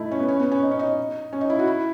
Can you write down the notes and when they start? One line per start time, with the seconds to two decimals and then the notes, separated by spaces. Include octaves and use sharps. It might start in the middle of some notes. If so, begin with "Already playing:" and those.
Already playing: A3 D#4 E4
0.11 C#4
0.19 B3
0.28 C#4
0.39 B3
0.52 C#4
0.63 D#4
0.71 C#4
0.79 D#4
1.33 C#4
1.41 D#4
1.50 E4
1.59 F#4
1.67 E4